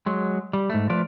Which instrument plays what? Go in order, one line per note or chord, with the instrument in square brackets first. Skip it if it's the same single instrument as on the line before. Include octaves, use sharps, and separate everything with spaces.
[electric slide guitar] F#3 G#3
G3
G#2 A3
F3 A3 F4 B4 D5